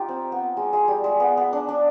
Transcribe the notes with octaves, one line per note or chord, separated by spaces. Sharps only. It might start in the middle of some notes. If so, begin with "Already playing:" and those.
Already playing: D#4 F4 G4
C4
B3
G#3
G#3
G3
G#3
B3
B3
D4
D4